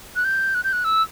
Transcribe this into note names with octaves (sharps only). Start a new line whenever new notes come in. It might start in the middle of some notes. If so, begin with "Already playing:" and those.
F#6
G6
F#6
G6
F#6
E6